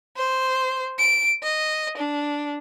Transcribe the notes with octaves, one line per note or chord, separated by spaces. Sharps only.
C5
D7
D#5
D4